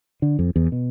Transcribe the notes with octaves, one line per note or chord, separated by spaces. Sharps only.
D3
F2
E2
B2